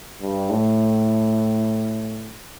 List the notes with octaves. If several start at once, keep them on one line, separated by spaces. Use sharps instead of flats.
G2
A2